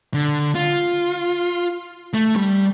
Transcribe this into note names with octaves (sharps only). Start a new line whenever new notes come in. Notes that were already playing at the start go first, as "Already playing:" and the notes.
D3
F4
A3
G3